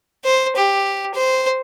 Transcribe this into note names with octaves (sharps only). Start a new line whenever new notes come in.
C5
G4
C5